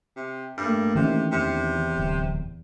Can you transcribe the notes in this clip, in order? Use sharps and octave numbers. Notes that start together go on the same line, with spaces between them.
C3
G2 A3 A#3
C3 D#3 E3 C#4
E2 C3
D1